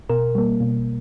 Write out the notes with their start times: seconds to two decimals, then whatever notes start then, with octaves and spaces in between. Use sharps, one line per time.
0.09 B2 A#4
0.35 G3 A#3
0.61 B2